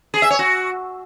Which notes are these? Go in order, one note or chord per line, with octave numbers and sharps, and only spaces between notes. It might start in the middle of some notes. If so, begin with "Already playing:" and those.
G#4
E5
C#5
F#4